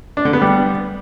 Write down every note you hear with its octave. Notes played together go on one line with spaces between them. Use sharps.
D4
D3
B3
G3